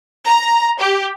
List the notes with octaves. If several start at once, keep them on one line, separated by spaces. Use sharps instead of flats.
A#5
G4